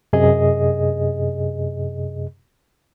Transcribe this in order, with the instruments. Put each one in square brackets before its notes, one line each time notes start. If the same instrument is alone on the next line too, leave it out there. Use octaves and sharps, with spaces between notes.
[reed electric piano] F#2 C3 G#4 D#5